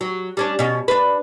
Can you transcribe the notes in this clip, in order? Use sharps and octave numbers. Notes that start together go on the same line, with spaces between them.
F#3
G3 C#4 D4
B2 C#4
D4 B4